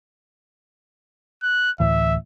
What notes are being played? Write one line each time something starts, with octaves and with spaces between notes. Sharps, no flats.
F#6
D2 A2 E3 E5